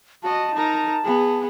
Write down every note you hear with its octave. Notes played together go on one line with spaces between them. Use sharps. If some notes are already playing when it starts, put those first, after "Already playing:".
F#4 D#5 A5
D#4 A#4
B3 G#4